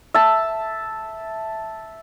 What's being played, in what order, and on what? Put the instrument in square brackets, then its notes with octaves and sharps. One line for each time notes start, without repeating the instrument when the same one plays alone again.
[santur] E5 A5